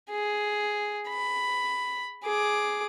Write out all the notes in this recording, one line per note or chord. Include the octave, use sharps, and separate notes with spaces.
G#4
B5
G#4 D6